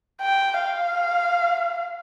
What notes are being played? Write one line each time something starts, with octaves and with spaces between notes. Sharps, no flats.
G5
F5